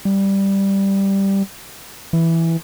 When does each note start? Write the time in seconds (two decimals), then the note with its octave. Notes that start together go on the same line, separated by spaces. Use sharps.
0.05 G3
2.13 E3